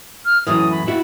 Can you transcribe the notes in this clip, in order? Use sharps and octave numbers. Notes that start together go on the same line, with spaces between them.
F6
F#2 A2 E3 D#6
B5
E4 F#4